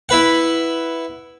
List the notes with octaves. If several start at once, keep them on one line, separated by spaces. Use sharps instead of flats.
E4 B4 F#5